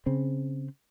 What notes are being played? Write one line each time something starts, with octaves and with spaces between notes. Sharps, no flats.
C#3 C4